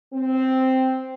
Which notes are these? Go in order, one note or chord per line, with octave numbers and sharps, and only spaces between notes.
C4